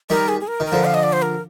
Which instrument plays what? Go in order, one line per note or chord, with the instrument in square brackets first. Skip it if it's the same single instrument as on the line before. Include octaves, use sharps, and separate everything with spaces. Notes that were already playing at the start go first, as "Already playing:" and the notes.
[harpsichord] D#3 G3 [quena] A#4
[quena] G#4
G#4
A#4
[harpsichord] D#3
[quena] A#4
[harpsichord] D3 F3
[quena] F5
D#5
D5
C5
A#4